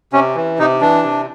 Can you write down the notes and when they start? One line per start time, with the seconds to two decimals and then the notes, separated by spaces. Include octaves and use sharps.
0.13 C3 C#4
0.35 E3
0.59 C3 D#4
0.81 E3 D4
1.03 C3